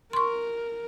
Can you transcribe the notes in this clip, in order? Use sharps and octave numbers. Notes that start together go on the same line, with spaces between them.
A#4 C6 C#6